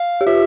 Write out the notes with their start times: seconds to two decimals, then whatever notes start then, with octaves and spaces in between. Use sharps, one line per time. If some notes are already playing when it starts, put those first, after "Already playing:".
Already playing: F5
0.21 G4
0.27 F4 E5